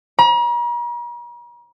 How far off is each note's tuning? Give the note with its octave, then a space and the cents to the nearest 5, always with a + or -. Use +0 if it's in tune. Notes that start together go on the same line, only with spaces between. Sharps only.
A#5 +45